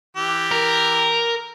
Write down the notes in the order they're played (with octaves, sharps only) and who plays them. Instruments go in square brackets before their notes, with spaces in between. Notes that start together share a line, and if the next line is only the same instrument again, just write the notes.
[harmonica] E3 G4
[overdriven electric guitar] A#4